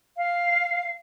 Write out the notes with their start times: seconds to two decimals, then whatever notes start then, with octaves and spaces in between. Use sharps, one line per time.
0.16 F5